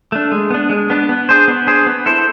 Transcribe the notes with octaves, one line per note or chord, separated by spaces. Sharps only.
A3 D4
G#3
B3 D4
G#3
B3 D4
B3
D4 G#4 C5
B3
D4 G#4 C5
B3
E4 A4 C5